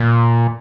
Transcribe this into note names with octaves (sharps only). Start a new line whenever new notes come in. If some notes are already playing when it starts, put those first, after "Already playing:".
Already playing: A#2